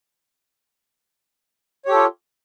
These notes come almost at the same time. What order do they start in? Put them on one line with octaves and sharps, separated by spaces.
C#5 G4 A4 F4